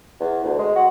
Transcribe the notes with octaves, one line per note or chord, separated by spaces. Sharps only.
E2
D2
G#3
F#4